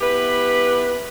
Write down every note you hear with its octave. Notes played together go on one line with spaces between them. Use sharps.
B3 E4 G4 B4